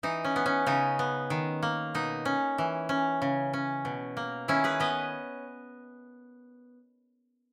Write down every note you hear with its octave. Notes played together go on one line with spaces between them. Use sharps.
E3 D#4
C#4
B3
C#4
C#3 D#4
B3
D#3
A#3
B2 D#4
C#4
E3
C#4
C#3
C#4
B2
A#3
D#3 C#4 E4
G#4 B4
B3 B4 D#5